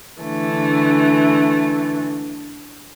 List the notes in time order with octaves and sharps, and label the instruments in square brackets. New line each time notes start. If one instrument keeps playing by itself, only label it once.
[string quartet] D3 E3 A3